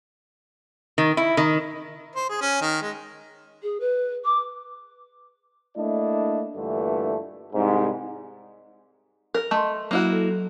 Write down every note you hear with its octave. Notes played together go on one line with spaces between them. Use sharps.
D#3
E4
D#3
C5
G#4
C#4
D#3
G#3
G#4
B4
D6
A3 A#3 D4 E4 D#5
G2 A#2 D3 E3 A3
C2 G#2
A#4
A3 D#5 C6
F#3 A#3 E4 F#4
A4